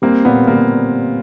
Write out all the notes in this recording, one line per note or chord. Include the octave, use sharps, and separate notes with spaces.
G3 A#3 C4
A#2 B3
G3 A#3